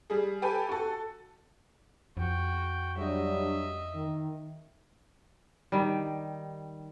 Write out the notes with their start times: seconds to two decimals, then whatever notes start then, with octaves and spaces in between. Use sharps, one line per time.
0.10 G3 G#4
0.42 G4 A4 B4 G#5
0.69 F#4 A4
2.17 F2 F#4 G5
2.97 F#3 G3 D4 D#5 E5
3.95 D#3
5.72 D#3 G3